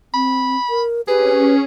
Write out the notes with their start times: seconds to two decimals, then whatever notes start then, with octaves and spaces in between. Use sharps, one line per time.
0.14 C4 B5
0.70 A#4
1.08 C#4 G4 G#4 B4